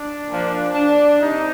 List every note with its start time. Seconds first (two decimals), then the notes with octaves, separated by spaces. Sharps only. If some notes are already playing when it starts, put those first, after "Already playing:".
Already playing: D4
0.27 A#2 F3
0.74 D4
1.20 C3 D#4